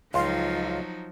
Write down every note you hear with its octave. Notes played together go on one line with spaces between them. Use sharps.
C#2 F3 F#3 D#4 F4 F5 C6